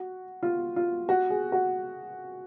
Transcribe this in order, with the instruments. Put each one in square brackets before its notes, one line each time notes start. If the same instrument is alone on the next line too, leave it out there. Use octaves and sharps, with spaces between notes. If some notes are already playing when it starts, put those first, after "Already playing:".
Already playing: [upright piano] F#4
F4
F4
F#4
G#4
F#4